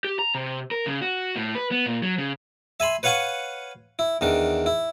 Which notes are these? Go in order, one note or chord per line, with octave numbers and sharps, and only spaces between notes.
G4
A#5
C3
A#4
C#3
F#4
A2
B4
B3
A#2
F#3
C#3
E5 G#5 B5 C6
B4 C#5 F5 F#5 G#5 C#6
E4
E2 D#3 D4
E4